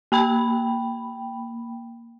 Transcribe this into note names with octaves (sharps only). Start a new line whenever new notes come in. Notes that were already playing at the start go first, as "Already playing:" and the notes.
A#3 G5 B5